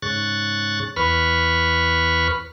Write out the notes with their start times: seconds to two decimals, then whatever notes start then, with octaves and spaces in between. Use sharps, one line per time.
0.02 G#2 C#3 C#6 F#6 A6
0.96 E2 B4 B5 C#6 F6